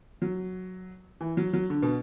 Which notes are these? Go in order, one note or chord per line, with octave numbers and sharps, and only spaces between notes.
F#3
E3
F#3
F#3
D3
B2